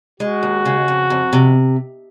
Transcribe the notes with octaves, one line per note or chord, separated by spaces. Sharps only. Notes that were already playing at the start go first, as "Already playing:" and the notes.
G#3 F#4
D#2
C#3
F2
F2
C3